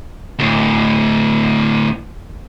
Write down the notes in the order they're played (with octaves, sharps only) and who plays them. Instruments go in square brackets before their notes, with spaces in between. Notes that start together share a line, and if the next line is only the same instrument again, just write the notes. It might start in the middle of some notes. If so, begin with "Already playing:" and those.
[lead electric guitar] D2 A2